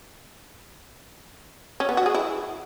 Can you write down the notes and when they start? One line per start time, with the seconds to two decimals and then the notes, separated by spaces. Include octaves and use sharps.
1.80 C#4
1.89 B3
1.97 F#4
2.06 G#4
2.14 E4